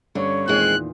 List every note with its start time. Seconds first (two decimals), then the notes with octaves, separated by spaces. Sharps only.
0.15 G2 D3 C#4 C#5
0.48 E2 A#2 D#3 G#3 C4 F#6